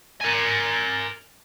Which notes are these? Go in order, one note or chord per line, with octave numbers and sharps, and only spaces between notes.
A#4 G#5